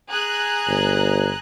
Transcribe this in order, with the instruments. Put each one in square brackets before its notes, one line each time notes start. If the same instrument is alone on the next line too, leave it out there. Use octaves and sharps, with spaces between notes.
[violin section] G#4 A#5 F#6
[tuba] G1